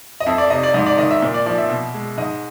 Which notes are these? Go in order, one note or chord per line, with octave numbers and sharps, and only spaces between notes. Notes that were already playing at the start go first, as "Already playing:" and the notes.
D#5
F2 E5
D5
C3 D#5
D5
G#2 D#5
D5
D#3 D#5
E5
A#2
D5
F3 D5
E5
B2
G#3
G#2 D#5